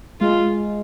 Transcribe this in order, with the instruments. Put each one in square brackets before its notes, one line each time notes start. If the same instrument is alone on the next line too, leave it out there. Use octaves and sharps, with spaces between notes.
[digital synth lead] G#3 [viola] F4